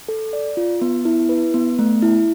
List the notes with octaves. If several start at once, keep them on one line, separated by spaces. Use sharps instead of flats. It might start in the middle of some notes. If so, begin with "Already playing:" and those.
A4
D5
F4
B3
E4
B4
B3
A3
E4